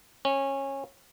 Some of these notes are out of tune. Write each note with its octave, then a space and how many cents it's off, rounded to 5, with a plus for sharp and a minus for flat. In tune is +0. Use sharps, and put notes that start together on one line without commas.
C#4 -20